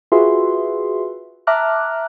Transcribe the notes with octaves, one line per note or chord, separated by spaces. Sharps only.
F4 F#4 G#4 B4 E5 C6
E5 A5 A#5 D6 F6 F#6